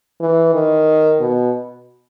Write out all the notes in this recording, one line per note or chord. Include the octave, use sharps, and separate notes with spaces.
E3
D#3
B2